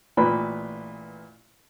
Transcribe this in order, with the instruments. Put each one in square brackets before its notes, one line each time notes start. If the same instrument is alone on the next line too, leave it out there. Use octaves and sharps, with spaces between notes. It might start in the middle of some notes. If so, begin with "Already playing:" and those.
[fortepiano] A1 A#2 B4 B5